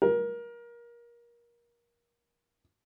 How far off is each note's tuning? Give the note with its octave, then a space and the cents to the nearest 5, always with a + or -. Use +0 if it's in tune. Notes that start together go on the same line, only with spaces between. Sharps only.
A#4 +25